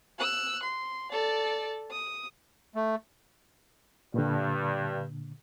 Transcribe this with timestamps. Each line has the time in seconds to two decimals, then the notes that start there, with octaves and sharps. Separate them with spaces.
0.19 E6 F#6
0.63 C6
1.11 A4 D5
1.91 D#6
2.75 A3
4.14 G2 A#2 D3